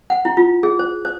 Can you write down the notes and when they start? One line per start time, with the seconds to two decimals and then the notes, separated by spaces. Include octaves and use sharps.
0.10 F#5
0.25 E4
0.37 F4
0.63 G#4
0.79 C5
1.05 C5